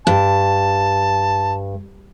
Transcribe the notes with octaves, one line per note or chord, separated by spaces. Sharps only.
G2 A5